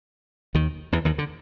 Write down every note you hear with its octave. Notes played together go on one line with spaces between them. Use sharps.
D#2 D#3
E2 E3
D#2 D#3
D3